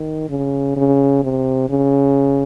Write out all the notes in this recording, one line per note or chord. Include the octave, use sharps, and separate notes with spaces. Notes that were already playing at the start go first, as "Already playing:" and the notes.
Already playing: D#3
C#3
C#3
C3
C#3